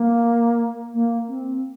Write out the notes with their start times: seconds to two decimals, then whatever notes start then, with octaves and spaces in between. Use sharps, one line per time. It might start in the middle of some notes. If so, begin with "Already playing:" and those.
Already playing: A#3
0.94 A#3
1.28 C4